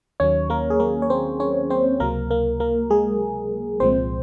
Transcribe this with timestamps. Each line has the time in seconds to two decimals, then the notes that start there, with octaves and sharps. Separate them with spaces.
0.20 D#2 D#3 F#3 C#4 C#5
0.50 A#3 A#4
0.70 G#4
0.80 A#3 A#4
1.02 C#5
1.10 C4 C5
1.40 C#4 C#5
1.70 C4 C5
2.00 C#2 C3 F#3 A#3 A#4
2.30 A#3 A#4
2.60 A#3 A#4
2.90 G#3 G#4
3.80 C2 A#2 F3 G#3 C4 C5